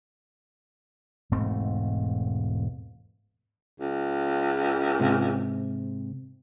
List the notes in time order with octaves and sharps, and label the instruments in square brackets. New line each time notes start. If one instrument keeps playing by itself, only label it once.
[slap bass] E1 G#2 A3 C4
[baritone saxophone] C#2
[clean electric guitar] G#2 C3